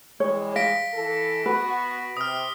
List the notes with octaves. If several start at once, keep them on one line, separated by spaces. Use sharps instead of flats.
E3 G3 G#3 C#5
F5 A#6 B6 D7
E3 A4
B3 F#4 B4
C3 D#6 F6